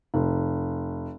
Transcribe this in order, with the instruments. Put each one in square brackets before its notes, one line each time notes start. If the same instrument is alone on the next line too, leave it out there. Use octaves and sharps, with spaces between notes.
[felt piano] F1